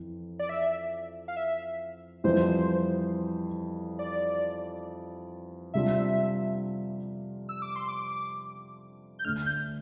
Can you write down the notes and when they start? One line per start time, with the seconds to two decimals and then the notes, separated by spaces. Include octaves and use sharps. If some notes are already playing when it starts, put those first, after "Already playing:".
Already playing: F2 E3
0.39 D5
0.49 E5
1.28 F5
1.36 E5
2.24 F2 E3 G3 C5
3.99 D5
5.74 C3 G3 D4 F4 E5
7.49 E6
7.62 D6
7.76 C6
7.88 D6
9.19 G6
9.25 D2 D3 A3 D4 F6
9.46 G6